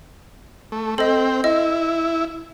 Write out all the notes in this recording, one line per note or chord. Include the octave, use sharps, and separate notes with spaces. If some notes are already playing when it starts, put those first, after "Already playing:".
A3
C4 A4 D#5 G5
E4 D#5